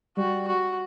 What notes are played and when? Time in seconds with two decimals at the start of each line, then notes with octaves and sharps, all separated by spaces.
0.17 G3 F#4
0.48 F#4